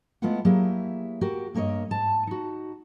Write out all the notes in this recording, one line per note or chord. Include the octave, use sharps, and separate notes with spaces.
G#3 A3 B3 E4 F4 F#5
F#3 A#3 E4 G4 G#4
F#4 G4 A#4
G2 A#3 A#4 C#5 D#5
G#2 A5
D#4 F#4